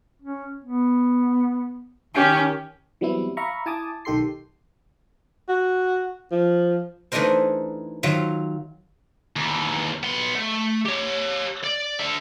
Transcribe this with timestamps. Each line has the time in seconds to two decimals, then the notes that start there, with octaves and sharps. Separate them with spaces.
0.22 C#4
0.64 B3
2.14 D#3 C#4 G4
3.01 E3 F#3 G3 B3 C4 E4
3.37 E5 F5 A#5 B5 C#6
3.66 E4 G#5 A5 D6 D#6
4.05 B1 D#3 G4 A4 C6 C7
5.49 F#4
6.32 F3
7.12 E3 A3 D4 D#4 A#4 C5
8.03 D#3 F#3 F4 E5 F5
9.36 D#2 E3
10.03 B3 C6
10.35 A3
10.85 G4 C#5
11.64 D5
11.99 D4 E5